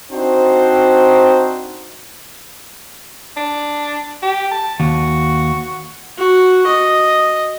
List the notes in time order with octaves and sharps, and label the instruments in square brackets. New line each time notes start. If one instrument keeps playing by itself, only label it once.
[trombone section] C4 D4 D#4 F#4 C5
[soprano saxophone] D4
G4
A5
[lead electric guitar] D#2 [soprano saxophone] F#4
[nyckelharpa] F#4
D#5